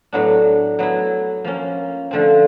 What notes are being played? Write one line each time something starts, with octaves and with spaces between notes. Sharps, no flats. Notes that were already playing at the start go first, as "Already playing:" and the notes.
A2 F#3 B3 D4
F#3 B3 E4
F3 A#3 C#4
D3 F3 A3 C4